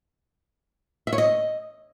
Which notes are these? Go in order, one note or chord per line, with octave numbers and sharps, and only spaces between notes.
E5
C#5
D#5